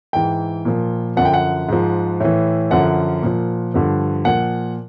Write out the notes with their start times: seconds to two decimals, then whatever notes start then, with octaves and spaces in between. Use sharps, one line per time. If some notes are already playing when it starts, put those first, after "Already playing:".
0.13 G#2 E3 G5
0.65 A#2 F3
1.17 F#2 D3 F3 F#5
1.25 G5
1.34 F#5
1.69 G#2 F3
2.20 A2 E3
2.71 F#2 D3 F3 F#5
3.22 A#2 F3
3.74 G2 D3 F3
4.25 A#2 F3 F#5